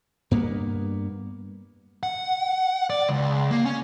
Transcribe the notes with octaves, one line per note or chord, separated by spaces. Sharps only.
G2 A#3 B3
F#5
D5
C#2
A#3
C#4